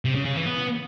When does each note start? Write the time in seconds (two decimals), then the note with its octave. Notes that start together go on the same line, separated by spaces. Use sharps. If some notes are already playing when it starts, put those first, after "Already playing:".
0.05 C3
0.15 C#3
0.26 C#3
0.36 E3
0.46 B3